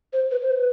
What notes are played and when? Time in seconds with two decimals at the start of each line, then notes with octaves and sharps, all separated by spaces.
0.13 C5
0.31 B4
0.42 C5
0.51 B4